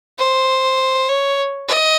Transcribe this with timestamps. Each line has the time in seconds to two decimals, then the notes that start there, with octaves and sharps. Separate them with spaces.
0.19 C5
1.09 C#5
1.68 D#5